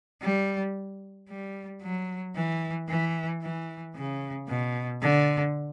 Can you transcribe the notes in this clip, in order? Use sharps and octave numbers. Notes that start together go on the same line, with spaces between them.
G3
G3
F#3
E3
E3
E3
C#3
B2
D3